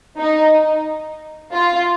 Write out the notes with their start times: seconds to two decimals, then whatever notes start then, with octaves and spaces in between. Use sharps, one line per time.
0.19 D#4
1.53 F4